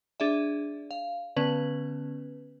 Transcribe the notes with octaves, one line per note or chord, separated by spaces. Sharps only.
D4 G#4 D5 E5
F5
D3 B3 C#4 B4